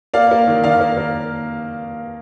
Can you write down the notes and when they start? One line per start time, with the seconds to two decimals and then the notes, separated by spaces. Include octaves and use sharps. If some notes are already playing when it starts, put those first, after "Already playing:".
0.14 A#3 D5 F5
0.31 A#3
0.48 D#3
0.64 D#3 D5 F5
0.81 A#3
0.98 A#3